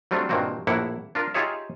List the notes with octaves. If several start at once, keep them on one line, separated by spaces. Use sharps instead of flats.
F#3 G3 A3 C4 D4 F4
G2 A#2 D#3 A#3 C4 F#4
A#1 A2 A#3 E4 F#5
D4 F4 A#4
D#4 F4 G4 G#4 C#5 E5